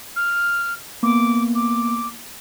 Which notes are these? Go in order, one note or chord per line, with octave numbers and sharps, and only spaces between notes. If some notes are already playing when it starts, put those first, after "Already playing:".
F6
A#3 B3 D6
D6